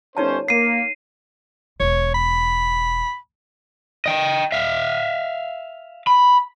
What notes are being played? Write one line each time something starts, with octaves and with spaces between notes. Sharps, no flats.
G1 C#4 D#4 C5 C#5 A5
A#3 C7 D#7
E1 C#5
B5
D#5 G5
E5 F5
B5